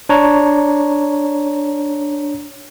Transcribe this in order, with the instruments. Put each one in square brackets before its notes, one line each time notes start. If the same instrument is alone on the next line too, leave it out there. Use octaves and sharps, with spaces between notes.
[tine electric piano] D4 C#5 A#5